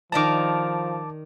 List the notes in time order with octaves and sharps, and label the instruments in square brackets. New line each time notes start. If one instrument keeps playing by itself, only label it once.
[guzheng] D#3 D5 A#5 [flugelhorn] F3 [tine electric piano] A5 D6